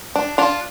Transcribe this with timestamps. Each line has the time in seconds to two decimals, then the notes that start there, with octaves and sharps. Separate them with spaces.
0.16 D4
0.38 D4 F4